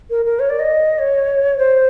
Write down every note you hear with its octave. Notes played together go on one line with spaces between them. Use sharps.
A#4
A#4
C#5
D5
D#5
C#5
C5